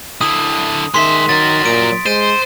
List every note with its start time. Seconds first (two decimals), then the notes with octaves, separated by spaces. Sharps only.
0.21 D3 E4 D#6
0.94 D#3 G#3 E5 C6 B6
1.29 F#3 A#4 A6
1.66 A#2 D7
2.06 G#3 C5 D#7